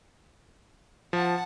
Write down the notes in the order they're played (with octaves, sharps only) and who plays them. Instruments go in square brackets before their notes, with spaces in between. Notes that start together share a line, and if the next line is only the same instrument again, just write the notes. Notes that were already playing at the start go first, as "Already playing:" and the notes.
[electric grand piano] F3 [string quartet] F#5 A5